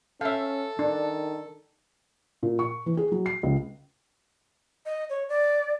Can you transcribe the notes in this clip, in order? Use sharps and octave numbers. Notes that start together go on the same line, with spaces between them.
C#4 A4 E5 F5
D#3 D4
A#2
C#6
E3
G#4
F#3
C7
C#2
D#5
C#5
D5